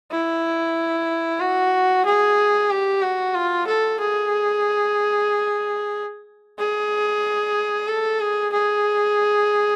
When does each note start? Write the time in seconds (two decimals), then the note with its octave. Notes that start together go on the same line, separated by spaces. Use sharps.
0.11 E4
1.40 F#4
2.06 G#4
2.70 G4
3.02 F#4
3.35 F4
3.67 A4
4.00 G#4
6.59 G#4
7.88 A4
8.20 G#4
8.53 G#4